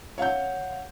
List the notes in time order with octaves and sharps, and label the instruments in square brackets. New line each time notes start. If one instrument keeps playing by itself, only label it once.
[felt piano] C#5 F5 F#5 G6